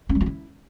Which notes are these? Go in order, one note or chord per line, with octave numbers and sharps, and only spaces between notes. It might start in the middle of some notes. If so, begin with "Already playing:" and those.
C#4
G3
F4
E4